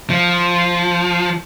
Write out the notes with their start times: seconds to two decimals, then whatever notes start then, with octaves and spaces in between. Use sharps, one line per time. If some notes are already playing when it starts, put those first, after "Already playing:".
0.10 F3